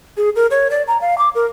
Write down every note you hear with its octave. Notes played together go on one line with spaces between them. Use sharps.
G#4
A#4
C#5
D5
A#5
F5
D6
A#4